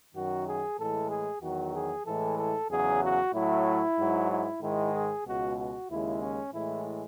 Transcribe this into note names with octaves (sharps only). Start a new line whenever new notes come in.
F#2 D#3 F#3 F#4
G#4
A2 E3 G#3 A4
G#4
E2 D#3 F#3 F#4
G#4
A2 E3 G#3 A4
A4
E2 C#3 F#3 G#4
F#4
A2 F#3 E4
G#2 F#3
E4
G#2 D#3 G#3 E4
G#4
C#2 B2 G#3 F#4
F#4
D#2 C#3 G#3 E4
C#4
A2 E3 G#3 E4